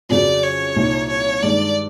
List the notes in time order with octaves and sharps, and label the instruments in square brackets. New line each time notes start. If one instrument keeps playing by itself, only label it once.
[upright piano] F2 C#3 F#3 [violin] D5
[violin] C#5
[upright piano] C2 A#2 F3 A#3 D#4
[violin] C#5
[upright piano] G2 D#3 G#3 [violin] D5